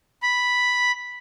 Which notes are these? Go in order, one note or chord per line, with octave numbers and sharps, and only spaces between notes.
B5